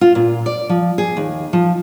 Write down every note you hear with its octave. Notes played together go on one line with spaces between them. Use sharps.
F4
A#2
D5
F3
G#4
D#2
F3